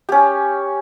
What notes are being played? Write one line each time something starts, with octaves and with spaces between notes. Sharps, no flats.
C#4 G4